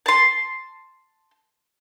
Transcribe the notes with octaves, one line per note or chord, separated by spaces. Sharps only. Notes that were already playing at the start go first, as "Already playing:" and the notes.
A5 C6